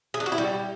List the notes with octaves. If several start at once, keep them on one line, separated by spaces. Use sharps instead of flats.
G#4
D4
F#4
E4
G3